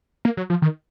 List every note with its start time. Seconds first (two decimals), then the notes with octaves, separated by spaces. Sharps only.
0.25 A#3
0.37 F#3
0.50 F3
0.62 D#3